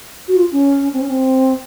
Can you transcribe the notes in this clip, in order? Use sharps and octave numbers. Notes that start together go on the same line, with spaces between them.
F#4
F4
C#4
C4
C#4
C4